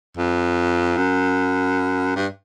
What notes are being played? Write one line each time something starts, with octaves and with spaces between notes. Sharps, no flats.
F2
F#2
G2